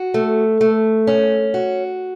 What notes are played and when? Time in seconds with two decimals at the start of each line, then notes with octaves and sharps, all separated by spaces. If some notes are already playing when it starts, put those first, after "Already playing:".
Already playing: F#4
0.14 A3
0.61 A3
1.07 C#4
1.54 F#4